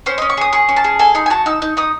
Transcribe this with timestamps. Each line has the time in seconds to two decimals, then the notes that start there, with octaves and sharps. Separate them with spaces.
0.06 C#4 C5
0.18 D#5
0.22 C#4
0.30 C#6
0.37 G#4 D#6
0.53 G#4 C#6
0.69 C#4
0.76 A5
0.84 G#4
0.99 A4 G#5
1.15 D#4 C6
1.26 G#5
1.30 F#4 A5
1.46 D#4 E6
1.62 D#4
1.77 D#4 D#6